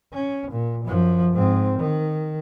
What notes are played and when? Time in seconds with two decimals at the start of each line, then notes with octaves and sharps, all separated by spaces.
0.13 C#4
0.52 A#2
0.86 F#2 F3
1.33 G#2 C4
1.79 D#3